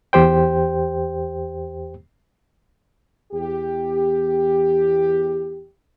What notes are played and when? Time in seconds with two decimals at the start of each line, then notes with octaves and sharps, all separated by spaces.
0.13 E2 G4 C5 G5
3.33 E2 G4